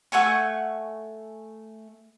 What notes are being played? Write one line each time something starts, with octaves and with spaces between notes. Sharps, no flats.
A3 F#5 G#5 C#6